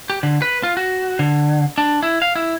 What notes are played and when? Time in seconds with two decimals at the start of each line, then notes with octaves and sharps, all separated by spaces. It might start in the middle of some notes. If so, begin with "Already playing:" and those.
0.10 G4
0.23 D3
0.42 B4
0.63 F4
0.77 F#4
1.19 D3
1.78 D4
2.03 E4
2.22 F5
2.35 E4